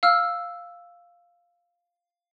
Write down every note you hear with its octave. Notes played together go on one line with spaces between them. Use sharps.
F5 E6 F6